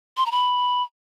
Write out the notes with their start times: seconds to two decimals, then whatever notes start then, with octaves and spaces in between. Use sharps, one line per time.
0.17 C6
0.26 A#5
0.31 B5